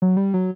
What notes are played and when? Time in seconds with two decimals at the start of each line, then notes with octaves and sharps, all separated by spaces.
0.02 F#3
0.17 G3
0.34 F#3